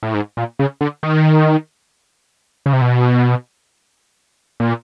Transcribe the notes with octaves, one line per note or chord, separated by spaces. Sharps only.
A2
G#2
A#2
C#3
D3
D#3
C#3
C3
B2
A#2